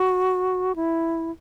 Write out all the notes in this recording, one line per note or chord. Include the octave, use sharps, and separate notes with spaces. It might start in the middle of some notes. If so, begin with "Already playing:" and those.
Already playing: F#4
E4